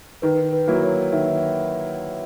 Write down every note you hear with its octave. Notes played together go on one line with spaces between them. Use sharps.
D#3 B4
B4
F#3 A#3 E4
C#5
D#3 E5